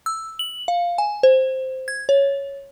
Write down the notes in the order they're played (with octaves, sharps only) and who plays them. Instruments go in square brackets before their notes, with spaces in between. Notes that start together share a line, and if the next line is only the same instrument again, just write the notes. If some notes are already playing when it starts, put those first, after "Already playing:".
[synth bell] E6
F#7
F5
G#5
C5
G#6
C#5